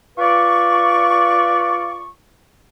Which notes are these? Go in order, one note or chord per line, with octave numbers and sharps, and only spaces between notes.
F4 B4 D5 C#6